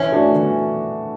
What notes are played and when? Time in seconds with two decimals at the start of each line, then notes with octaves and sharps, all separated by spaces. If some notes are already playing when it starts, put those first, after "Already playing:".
Already playing: E3 C#4
0.12 A3 D4 F#4
0.35 E3